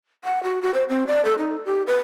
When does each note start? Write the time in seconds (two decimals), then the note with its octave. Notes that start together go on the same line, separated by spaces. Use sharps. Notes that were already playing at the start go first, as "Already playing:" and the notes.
0.24 F#5
0.43 F#4
0.62 F#4
0.74 C5
0.89 C4
1.07 D5
1.25 A4
1.38 D#4
1.65 G4
1.87 B4